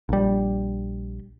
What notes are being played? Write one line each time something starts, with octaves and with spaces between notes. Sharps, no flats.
A#1 G3